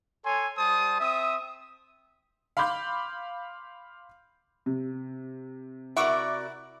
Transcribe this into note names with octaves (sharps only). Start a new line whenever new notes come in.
A4 C#5 G#5 C6
G3 C5 A5 D#6
C4 E5 D#6
F5 B5 C6 D6 G6
C3
E4 F#4 A#4 D5 E5 C#6 D6